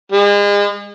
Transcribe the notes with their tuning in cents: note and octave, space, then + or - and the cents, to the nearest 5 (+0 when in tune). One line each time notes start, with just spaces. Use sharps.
G#3 -35